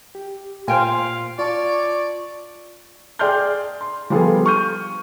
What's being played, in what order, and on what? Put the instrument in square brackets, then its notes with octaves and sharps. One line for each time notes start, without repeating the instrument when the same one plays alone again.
[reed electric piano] G4
[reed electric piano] A#2 [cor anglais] F4 [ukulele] C5 G5 G#5
[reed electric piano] F4 A5 C#6 [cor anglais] C#5 [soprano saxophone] D5
[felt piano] G#4 D5 G5 C6 F6 G6
C6
F3 G3 B3 F4 G#4 A4
C#6 F6 G6 D#7